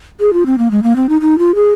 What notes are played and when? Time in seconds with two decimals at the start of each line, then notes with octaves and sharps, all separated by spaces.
0.20 G#4
0.33 F4
0.46 C4
0.58 A#3
0.71 G#3
0.83 A#3
0.96 C4
1.09 D#4
1.21 D#4
1.38 F4
1.55 G#4